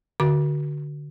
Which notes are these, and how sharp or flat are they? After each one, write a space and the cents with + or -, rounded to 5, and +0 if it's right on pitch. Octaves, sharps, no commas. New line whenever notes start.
D3 +0 F#4 +0 D6 +0